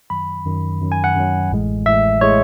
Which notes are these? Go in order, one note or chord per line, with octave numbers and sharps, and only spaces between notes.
F#2 D#3 F#3 B5
F#2 D#3 F#3
F#2 D#3 F#3
G#5
F#5
F#2 D#3 F#3
A1 A2 G#3
A1 A2 G#3 E5
A2 G#3 C#5